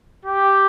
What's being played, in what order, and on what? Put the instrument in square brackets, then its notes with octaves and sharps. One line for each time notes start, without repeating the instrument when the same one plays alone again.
[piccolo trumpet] G4